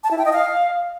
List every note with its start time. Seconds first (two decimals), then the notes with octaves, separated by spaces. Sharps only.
0.04 A5
0.11 E4
0.18 G5
0.25 D#5
0.33 F5